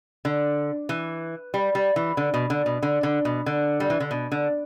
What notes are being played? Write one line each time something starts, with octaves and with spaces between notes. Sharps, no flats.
D3
E3
G3
G3
E3
D3
B2
D3
B2
D3
D3
B2
D3
G3
E3
D3
B2
D3